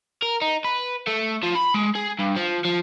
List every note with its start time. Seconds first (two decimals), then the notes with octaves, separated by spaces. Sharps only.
0.22 A#4
0.42 D#4
0.65 B4
1.07 A3
1.43 F3
1.55 B5
1.74 G#3
1.95 G#4
2.19 G2
2.37 F3
2.65 F3